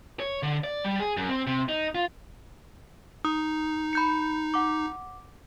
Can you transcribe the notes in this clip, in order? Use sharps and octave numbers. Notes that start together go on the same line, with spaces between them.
C#5
D3
D5
G3
G#4
F#2
C4
C3
D#4
F4
D#4 D#6
B5 G6 C#7
F#5 D6